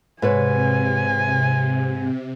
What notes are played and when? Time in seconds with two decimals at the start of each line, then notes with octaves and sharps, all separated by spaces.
0.22 G#2 C3 B4 C#5 G#5